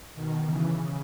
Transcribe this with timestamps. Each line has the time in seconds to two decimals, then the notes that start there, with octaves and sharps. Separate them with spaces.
0.14 B2 D#3
0.44 C#3 E3
0.73 C#3